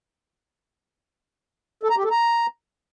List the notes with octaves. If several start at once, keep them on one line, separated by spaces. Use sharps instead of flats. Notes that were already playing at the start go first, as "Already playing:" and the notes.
A4
A#5
G4
A4
A#5